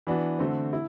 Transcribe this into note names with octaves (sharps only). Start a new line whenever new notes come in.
E3 B3 D4 F#4
D3 A3 C4 F#4
E4